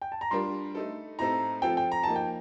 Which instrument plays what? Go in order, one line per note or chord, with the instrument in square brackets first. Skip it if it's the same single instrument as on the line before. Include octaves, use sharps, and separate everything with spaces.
[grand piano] G5
A5
A#5
[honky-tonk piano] G3 D4 F4 A#4 [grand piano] C6
[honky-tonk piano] A3 D#4 A4
[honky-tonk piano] A2 A3 C4 D#4 A4 [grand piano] A#5
[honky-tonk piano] F3 C4 F4 A4 [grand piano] G5
[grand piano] G5
A#5
[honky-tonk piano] F3 A#3 D#4 [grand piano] A5
[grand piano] G5